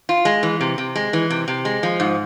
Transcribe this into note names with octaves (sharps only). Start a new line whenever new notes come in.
F4
G#3
E3
C3
C3
G#3
E3
C3
C3
G#3
F3
G#2